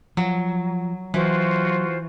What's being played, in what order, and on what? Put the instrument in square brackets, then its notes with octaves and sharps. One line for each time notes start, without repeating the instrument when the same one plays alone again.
[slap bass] F3 [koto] F#3
[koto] E3 [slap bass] F#3 [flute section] F4 F#4 C5